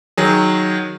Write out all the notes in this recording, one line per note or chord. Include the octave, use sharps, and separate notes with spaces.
D#3 F#3 G#4